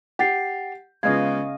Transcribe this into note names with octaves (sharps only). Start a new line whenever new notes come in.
G4 F#5 A6 C7
C#3 G#3 B3 F4 D#5 F5 G#6